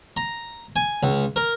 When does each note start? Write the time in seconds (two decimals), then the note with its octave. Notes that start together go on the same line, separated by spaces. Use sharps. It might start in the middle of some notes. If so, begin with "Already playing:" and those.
0.17 A#5
0.76 G#5
1.03 C#2
1.36 A#4